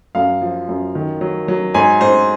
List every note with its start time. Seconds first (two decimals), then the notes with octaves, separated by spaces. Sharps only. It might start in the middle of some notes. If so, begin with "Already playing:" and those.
0.15 F#2 F5
0.42 F3
0.69 F#2
0.95 D#3
1.21 F#3
1.48 F#3
1.74 G#2 G#5
2.01 G#2 C5